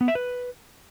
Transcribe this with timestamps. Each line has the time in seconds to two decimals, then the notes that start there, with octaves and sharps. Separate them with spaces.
0.01 B3
0.08 E5
0.15 B4